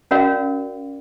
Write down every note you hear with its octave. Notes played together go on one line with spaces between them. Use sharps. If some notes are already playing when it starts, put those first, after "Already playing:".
C#4 F#4 A#4 D5 F5